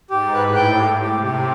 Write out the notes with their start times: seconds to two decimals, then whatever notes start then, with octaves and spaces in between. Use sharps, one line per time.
0.10 G#2 G4
0.34 B4
0.45 A2
0.55 G5
0.79 G4
1.01 G4
1.13 C3
1.24 G4